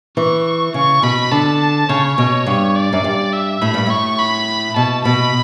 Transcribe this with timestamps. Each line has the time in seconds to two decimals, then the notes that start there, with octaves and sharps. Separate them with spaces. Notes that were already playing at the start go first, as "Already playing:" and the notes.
0.17 E3 C#6
0.74 C#3 C#6
1.03 B2 B5
1.32 D3 A5
1.89 C#3 C#5
2.18 B2 C#5
2.46 G2
2.75 D5
2.93 F#2
3.04 G2
3.33 E5
3.62 A2 B5
3.74 G2
3.86 A2 C#6
4.19 B5
4.76 B2 A5
5.05 B2 B5